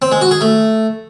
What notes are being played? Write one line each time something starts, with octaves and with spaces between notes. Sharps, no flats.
C4
G#3
F#4
G#4
A3